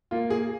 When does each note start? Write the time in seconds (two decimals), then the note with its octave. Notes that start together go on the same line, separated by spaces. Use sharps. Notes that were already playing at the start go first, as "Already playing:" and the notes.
0.11 A#3 F4
0.30 G#4